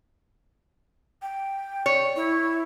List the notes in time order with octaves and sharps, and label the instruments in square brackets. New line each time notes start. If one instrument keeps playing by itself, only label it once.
[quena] G5
[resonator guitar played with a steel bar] C#5
[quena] E4